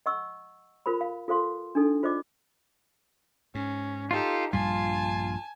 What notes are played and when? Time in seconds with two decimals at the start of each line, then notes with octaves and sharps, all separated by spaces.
0.06 D#5 F#5 C#6 E6
0.86 F4 A#4 C5 B5
1.01 F5
1.28 F4 A4 C5 F5 C6
1.75 D4 D#4 A4
2.03 F4 C5 D5 D#5 D6
3.55 G#2 C#4
4.11 D#4 F4 G4 A4
4.53 A#1 G2 G3 F4 G#5 A5